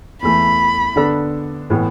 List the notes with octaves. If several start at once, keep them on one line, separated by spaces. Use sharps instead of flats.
E2 E3 A3 B5
D3 B3 D4 A4
A2 E3 B3